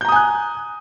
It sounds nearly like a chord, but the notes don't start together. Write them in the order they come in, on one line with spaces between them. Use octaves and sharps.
G6 A#5 D#6 G#5 F#6